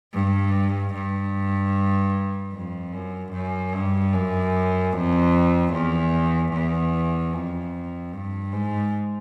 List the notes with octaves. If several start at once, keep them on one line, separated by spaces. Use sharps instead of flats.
G2
G2
F2
F#2
F#2
G2
F#2
F2
E2
E2
F2
G2
G#2